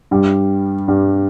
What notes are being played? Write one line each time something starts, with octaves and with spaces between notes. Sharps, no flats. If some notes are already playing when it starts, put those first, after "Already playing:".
G2 G3
G2 G3